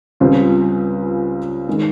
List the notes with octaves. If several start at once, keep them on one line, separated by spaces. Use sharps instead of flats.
C#2 C#3 G3 C4 F4
D#3 G#3